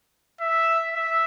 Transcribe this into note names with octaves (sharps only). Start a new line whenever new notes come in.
E5
E5